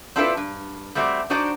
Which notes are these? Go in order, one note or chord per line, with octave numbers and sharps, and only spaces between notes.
C4 D4 E4 F4 A4 B4
G2
G3 A3 C4 F#4 D5
D4 D#4 F#4 C5 D5